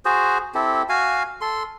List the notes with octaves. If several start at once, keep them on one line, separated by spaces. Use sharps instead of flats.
F#4 G#4 C5
C4 E4 G4 A4
F#4 F5 G#5
A4 C6